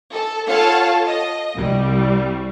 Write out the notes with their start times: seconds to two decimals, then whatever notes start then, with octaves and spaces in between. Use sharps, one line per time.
0.12 A4
0.47 F4 A4 C#5 F5 F#5 A5
1.07 D#5
1.56 C2 G3